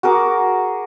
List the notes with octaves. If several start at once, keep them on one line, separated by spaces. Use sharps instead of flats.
F#4 G#4 A#4 D6